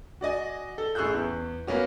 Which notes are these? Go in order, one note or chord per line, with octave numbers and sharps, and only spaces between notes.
F#4 D5 D#5 G#5
A4
A1 G#4 C#6 E6 F#6 G6
E2
A#3 B3 C#4 F#4